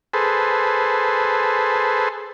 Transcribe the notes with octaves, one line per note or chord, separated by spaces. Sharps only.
G#4 A4 B4 C5